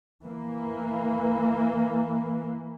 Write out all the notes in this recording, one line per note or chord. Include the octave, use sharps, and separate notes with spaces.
E3 A#3